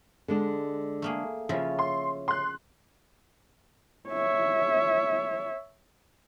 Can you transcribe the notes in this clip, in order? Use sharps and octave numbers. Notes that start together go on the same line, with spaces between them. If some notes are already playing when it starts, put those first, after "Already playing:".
D3 G#3 D4
A3 A#3 G#4
C#3 F3 E4 F4 C#5 E5
C6
C6 F#6
C#5 E5